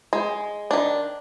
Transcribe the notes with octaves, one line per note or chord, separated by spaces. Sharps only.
G#3
D#3 D4